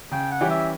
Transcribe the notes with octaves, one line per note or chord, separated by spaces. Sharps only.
C#3 G5
F#5
E3 G3 C#4 G4
E5